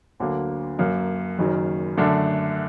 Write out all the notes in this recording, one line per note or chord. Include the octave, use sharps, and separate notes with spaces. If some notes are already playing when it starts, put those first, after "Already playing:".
D2 D3 F#3 A#3
F#2 F#3 A#3
F#1 F#2 D#3 F#3
F#2 D3 A3 D4